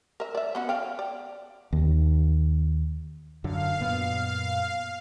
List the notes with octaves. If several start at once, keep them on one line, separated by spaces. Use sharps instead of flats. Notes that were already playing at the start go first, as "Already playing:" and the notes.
A#4 E5
D5 E5
B3 C#4 F#4
D5 F5 G5
D5
D#2
F#2 D3 F5
F#2 A#2 B3